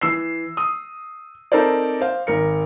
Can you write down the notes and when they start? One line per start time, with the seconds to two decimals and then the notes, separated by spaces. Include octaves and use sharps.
0.01 E3 E6 C7
0.57 D#6
1.52 C4 D#4 A4 A#4 C5 D5
2.01 C5 F5
2.27 G#1 A#4 C#7